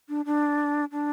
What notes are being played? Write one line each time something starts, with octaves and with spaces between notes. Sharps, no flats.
D4
D4
D4